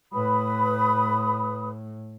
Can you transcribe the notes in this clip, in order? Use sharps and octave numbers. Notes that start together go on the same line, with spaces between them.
A2 B4 B5 D#6